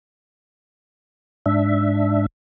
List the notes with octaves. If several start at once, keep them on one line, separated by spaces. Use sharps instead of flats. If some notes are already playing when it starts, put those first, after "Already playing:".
G#2 D4 E5